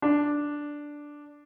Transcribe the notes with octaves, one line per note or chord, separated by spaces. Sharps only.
D4